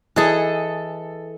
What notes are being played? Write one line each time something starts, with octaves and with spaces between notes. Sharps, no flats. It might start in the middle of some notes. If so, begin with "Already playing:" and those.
E3 G#4 A4 D#5